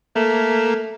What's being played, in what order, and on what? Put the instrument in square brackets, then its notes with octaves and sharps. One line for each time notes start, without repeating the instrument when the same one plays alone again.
[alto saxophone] A3 [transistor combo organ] A#3